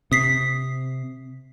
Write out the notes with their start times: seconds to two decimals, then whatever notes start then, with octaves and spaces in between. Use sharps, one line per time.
0.12 C3 D#6 B6 C7